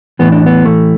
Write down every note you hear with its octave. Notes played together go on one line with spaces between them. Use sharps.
A2 E3 B3
D4
B3
A3